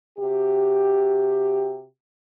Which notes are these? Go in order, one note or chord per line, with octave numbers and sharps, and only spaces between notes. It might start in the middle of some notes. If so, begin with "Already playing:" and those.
C3 F#4 G4